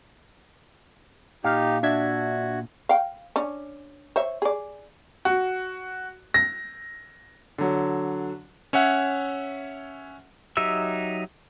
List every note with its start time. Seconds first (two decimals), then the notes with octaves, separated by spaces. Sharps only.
1.44 A#2 D#4 G4 F5
1.83 D4 F#4 E5 G#6
2.89 F5 G5
3.36 C#4 D4
4.16 C5 C#5 E5
4.42 G#4 D5
5.25 F#4
6.34 A#6
7.58 D3 F#3
8.73 C#4 C#5 E5 F#5
10.57 F#3 D#4 G4 E5 E6